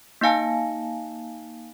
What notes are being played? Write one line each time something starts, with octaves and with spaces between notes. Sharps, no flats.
A#3 D#4 F5 G#5 A5